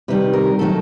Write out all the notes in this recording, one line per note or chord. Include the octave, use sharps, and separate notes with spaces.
C3 D#3 G3 B4
A#4
D#3 F#3 A3 A4